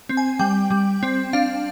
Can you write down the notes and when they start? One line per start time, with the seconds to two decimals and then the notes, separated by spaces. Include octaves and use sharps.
0.09 C4
0.17 G#5
0.39 G3 G5
0.71 G3
1.03 C4
1.33 D4 F5